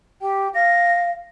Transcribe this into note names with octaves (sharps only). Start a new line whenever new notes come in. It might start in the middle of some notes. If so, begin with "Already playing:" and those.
G4 G5
F5 A#6